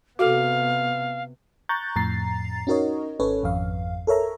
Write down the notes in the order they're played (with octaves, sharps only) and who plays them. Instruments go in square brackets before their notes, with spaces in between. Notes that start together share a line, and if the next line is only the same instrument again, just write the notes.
[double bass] C3 B3 [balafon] F#4 A4 [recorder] F5
[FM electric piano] A#5 C#6 F#6 G6 A6
F2 A2 A#5 A6 C7
C#4 D#4 F#4 A#4 C#5 D#5
G#1 C#4 A4 B4 C#5
G#1 F2 F5
A4 A#4 C#5 E5 A#5